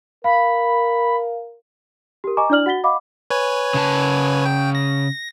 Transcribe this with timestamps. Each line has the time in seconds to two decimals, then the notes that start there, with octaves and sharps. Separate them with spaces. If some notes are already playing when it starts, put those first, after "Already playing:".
0.24 A#4 F5 B5
2.24 G4 A#4
2.37 D#5 G#5 A#5 C#6 D6
2.50 D4 E4 D5 F6 F#7
2.66 F#4 F#5 A6 B6 G7
2.84 D#5 F5 F#5 B5 D6
3.30 B4 C#5 G#5
3.74 C#3 A5
4.45 G5
4.75 A#6